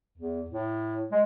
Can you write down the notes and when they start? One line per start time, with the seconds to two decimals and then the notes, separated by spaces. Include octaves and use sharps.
0.18 E2
0.50 A2
1.12 G#3